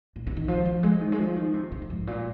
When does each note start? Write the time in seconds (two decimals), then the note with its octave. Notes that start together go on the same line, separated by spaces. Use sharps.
0.16 A#2
0.27 C3
0.37 D#3
0.48 F3
0.65 F3
0.83 G#3
1.01 D#3
1.12 G#3
1.19 F3
1.36 D#3
1.54 C3
1.72 C3
1.82 F2
1.90 G#2
2.07 A#2